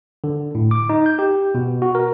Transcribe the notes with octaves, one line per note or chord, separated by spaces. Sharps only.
D3
A2
D6
D#4
G6
G4
B2
F#4
A#4